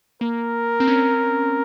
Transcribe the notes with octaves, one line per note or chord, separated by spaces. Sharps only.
A#3 A#4
C4
C#4